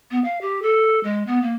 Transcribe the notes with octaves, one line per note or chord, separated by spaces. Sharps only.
B3
F5
G4
A4
G#3
B3
A#3